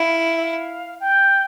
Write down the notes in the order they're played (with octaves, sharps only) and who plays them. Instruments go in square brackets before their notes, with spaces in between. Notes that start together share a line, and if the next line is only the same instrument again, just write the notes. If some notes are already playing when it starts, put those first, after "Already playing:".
Already playing: [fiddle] E4 [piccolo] F5
[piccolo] E5
F5
G5